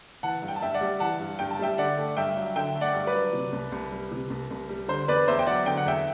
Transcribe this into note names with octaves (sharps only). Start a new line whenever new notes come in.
E3 F#5 A5
G2
G5
A5
G2 E5 G5
D5 F#5
G3
E3 F#5 A5
G2
G2 G5
A5
G3 E5 G5
D3 D5 F#5
A3
G2 E5 G5
F#3
D3 E5 G5
A3
D5 F#5
G2
B4 D5
F#3
C3
C2
C2
G3
C3
C2
C2
G3
D3 C5
E2 B4 D5
E2 C5 E5
G5
F#3 D5 F#5
D3 G5
F#5
E2 E5 G5